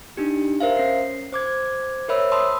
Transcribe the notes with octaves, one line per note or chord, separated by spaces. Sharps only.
D4 D#4 G4
A#4 C5 E5 F5
C#4 C7
C5 D6 G#6
A#4 C5 C#5 E5 B5 E6
A5 B5 C6 D#6 E6